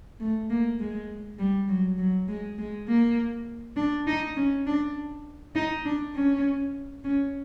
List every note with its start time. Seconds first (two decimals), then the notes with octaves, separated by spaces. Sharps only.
0.20 A3
0.50 A#3
0.80 G#3
1.39 G3
1.68 F#3
1.98 F#3
2.28 G#3
2.58 G#3
2.88 A#3
3.77 D4
4.07 D#4
4.36 C#4
4.67 D4
5.55 D#4
5.85 D4
6.15 C#4
7.04 C#4